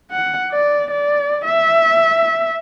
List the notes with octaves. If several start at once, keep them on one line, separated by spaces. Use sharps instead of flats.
F#5
D5
D5
E5